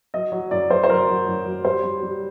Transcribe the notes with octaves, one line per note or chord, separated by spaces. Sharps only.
F#3 D#5
F#3
F#2 D5
F#3 C5
C5
F#3 A#4
F#3
F#2
F#3
G3 C5
G3
G3